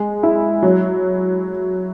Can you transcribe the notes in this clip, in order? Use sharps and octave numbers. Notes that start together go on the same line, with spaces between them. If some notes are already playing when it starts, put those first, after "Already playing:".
Already playing: G#3
E4
F#3